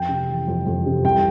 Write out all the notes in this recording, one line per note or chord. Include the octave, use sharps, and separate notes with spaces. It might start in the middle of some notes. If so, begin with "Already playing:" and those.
Already playing: F2 G5
C3
E3
F2
F2
C3
C2 G5